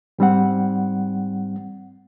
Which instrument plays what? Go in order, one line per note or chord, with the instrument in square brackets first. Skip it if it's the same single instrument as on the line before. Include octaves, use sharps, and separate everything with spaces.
[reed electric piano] G#2 G3 C4 F#5